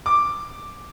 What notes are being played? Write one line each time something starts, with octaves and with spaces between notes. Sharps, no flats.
D6